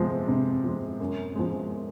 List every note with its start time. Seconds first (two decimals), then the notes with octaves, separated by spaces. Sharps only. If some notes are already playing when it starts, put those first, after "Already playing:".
Already playing: C3 F3 G#3
0.28 C3
0.64 F3 G#3
1.00 F#2
1.36 F3 G#3